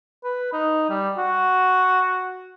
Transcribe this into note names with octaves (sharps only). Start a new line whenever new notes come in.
B4
D#4
G3
F#4